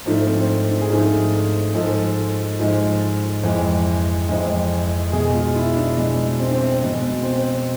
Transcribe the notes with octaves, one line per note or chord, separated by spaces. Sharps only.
G#2 F3 A3 D4
C4
D4
G#4
G#2 F3 A3 F4
G#2 F3 G#3 A4
G#2 F3 G#3
F2 E3 G#3
F2 E3 G#3
B2 G#3 G#4
F4
E4
D4
B2 G#3
C4
D4
C4
B2 G#3
C4